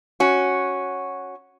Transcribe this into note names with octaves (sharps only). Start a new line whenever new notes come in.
C#4 F#4